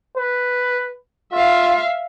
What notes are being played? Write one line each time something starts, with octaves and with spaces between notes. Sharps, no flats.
B4
F4 E5 F5